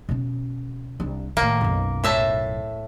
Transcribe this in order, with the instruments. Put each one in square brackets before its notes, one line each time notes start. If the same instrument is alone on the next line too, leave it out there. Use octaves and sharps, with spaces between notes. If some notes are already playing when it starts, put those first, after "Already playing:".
[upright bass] B2 C#4
C2 D4
[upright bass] A2 D#3 [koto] A#3
[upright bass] B1 F#2
[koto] A2 E5 A5